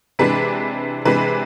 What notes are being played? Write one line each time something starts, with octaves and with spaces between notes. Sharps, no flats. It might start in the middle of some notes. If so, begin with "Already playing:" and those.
C3 E3 G#3 D4 B4
C3 E3 G#3 D4 B4